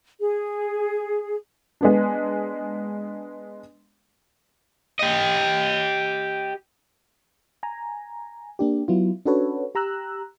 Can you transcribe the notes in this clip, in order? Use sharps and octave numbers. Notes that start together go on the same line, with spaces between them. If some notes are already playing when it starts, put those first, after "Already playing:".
G#4
G#3 B3 D4
G4 D#5
G#5 A#5
A#3 D4 G4
F#3 B3 E4 F4
C#4 D4 F#4 A4 B4 C#5
G4 A#5 E6 F#6